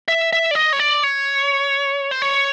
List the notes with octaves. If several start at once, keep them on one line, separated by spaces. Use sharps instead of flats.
E5
E5
D5
D#5
C#5
D5
C#5
C5
C#5